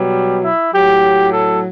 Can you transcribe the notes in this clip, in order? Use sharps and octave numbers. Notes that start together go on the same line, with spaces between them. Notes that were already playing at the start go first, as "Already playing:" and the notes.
Already playing: B2 F#3 G3
E4
A2 F#3 G4
A4